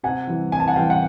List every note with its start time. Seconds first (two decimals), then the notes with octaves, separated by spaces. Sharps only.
0.04 C3 F#5 G#5
0.27 E3 G3
0.52 C3 G#5
0.60 A5
0.67 F#5 G#5
0.76 E3 G3 F5 G5
0.90 F#5